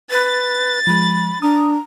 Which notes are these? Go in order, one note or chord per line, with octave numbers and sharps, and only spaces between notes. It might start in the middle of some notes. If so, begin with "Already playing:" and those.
B4 A6
F3 G#3 B5
D4 A#5 D#6